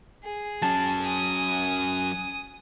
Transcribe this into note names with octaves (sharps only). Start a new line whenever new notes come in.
G#4
F#3 C#4 A5
G#5 D#6